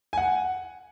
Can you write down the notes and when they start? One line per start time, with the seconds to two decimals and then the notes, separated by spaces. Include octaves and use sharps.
0.13 G#5
0.18 F#5